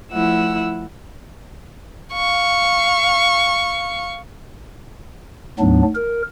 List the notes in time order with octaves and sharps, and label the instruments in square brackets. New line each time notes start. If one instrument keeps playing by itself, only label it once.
[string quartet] F3 A3 E4 F#5 E6
[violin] F5 C#6
[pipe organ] D2 G#2 F#3 B3 D4
A#4